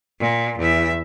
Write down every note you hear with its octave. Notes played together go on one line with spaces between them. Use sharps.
A#2
E2 E5